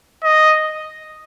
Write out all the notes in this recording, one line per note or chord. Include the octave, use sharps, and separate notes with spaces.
D#5